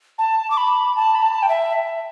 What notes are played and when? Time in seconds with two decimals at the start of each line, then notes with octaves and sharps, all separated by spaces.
0.18 A5
0.50 D6
0.57 B5
0.96 A5
1.15 B5
1.22 A5
1.42 G5
1.49 E5